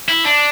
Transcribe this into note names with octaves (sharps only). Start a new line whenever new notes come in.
E4
D4